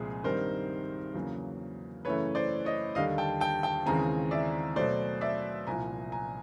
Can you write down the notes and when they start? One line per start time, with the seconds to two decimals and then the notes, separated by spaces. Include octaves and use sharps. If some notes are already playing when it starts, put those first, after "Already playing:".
Already playing: C2 A#2 F3 G#3 C4 G#4
0.24 G2 D#3 G3 C4 D#4 A#4 C5
1.14 E2 C#3 F#3 A#3
2.05 F#2 C#3 E3 A3 B4 C#5
2.35 C5 D5
2.65 C#5 D#5
2.95 D#2 D3 G3 D#5 F5
3.18 G5 A5
3.40 G5 A5
3.63 G5 A5
3.86 D#2 C#3 E3 G#3 C4 G#5 A#5
4.31 D5 E5
4.76 B2 F#3 A3 C5 D5
5.21 D5 E5
5.67 C2 A#2 F3 G#5 A#5
6.12 G#5 A#5